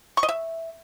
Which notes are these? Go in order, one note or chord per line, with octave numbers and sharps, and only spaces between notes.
C#6
D#5
E5